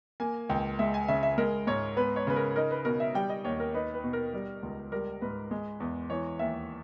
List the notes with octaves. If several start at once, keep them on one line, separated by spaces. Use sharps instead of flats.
A#3 G#5
C#2 G5
G#3 E5
G#5
C#3 E5
E5
G#3 A#4
G#2 C#5
B3 B4
C#5
C#3 B4
A#4
D#4 A#4
B4
B2 A#4
E5
G3 G5
D#5
D#2 C#5
A#4
D#4 B4
B4
B2
A#4
G3
C#2
G3 A#4
G#2 B4
G#3
E2
E3 C#5
D#2 E5